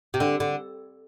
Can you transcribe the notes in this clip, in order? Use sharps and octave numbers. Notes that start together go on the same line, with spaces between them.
C3
D3
D3